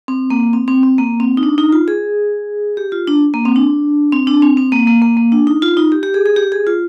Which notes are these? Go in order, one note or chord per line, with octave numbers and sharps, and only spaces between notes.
C4
A#3
C4
C4
C4
A#3
C4
D#4
D4
D#4
F4
G#4
G4
F4
D4
A#3
C4
D4
C4
D4
C4
C4
A#3
A#3
A#3
A#3
D4
D#4
F4
D#4
G4
G4
G#4
G#4
G4
G#4
F4